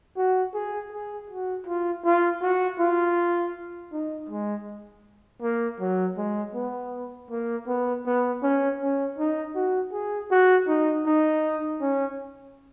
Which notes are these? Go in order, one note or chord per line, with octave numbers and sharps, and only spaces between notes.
F#4
G#4
G#4
F#4
F4
F4
F#4
F4
D#4
G#3
A#3
F#3
G#3
B3
A#3
B3
B3
C#4
C#4
D#4
F#4
G#4
F#4
D#4
D#4
C#4